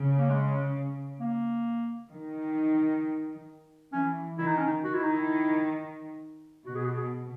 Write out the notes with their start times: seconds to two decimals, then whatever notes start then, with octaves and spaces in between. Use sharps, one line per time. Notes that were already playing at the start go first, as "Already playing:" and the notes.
Already playing: C#3
0.18 A#3
0.30 G#3
1.20 A#3
2.11 D#3
3.93 E3 C#4
4.38 D#3 E4
4.48 D#4
4.57 C#4
4.66 D#4
4.83 D#3 F#4
4.94 E4
5.04 D#4
5.14 E4
6.65 B2 F#4
6.75 G#4
6.85 F#4
6.96 G#4